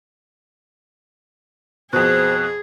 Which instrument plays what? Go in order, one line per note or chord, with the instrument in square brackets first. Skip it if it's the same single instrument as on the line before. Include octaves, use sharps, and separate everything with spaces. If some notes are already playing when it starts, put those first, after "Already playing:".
[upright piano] F2 B2 [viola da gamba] G#4 [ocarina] C5 [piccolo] F#6